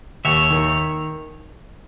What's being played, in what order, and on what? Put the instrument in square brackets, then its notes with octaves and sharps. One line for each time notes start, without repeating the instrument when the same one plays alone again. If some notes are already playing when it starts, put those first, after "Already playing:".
[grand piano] D#2 [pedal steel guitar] C#5 E5
[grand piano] D#3